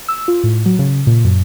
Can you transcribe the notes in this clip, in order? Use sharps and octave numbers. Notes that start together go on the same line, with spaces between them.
E6
F4
A2
F#3
C#3
A#2
F#2